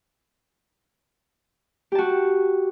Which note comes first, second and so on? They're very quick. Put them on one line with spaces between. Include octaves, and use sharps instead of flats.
G4 A5 F#4